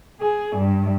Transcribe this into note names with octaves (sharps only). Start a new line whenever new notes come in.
G#4
G2